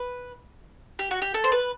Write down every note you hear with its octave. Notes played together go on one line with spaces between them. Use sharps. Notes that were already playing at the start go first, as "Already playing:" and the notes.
Already playing: B4
G4
F#4
G4
A4
C5
B4